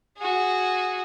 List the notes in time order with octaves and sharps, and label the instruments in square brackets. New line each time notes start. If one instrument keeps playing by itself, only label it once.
[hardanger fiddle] F#4 G#4